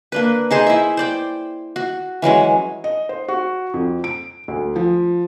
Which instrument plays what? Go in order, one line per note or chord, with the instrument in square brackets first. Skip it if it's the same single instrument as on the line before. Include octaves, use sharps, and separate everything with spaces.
[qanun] A#3 D4 B4
D#4 G#4 C5 C6
E4 E5
C5 D5 G5
F#4
E3 F#3 G#3 C#4
[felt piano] D#5
C5
F#4
F2
D7
D2
F3